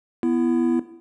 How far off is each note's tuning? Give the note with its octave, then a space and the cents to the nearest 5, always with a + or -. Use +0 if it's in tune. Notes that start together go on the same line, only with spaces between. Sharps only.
B3 +0 E4 +25